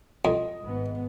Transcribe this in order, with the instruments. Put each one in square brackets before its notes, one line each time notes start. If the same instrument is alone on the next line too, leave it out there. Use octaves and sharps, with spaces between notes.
[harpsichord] F2 [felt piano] D#5
[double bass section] G#1 G#2 B3